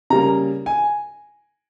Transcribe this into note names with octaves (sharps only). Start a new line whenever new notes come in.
C#3 G3 A#3 A#5
G#5